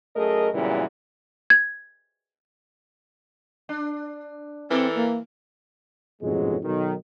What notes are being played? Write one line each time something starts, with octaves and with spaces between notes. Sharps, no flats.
F#2 A3 G#4 A#4 D#5
F#2 A#2 C#3 E3 G3 B3
G#6
D4
E3 C4 A4 A#4 D5
A#3
A1 F2 G#2 B2 F#3 G#3
B1 D#3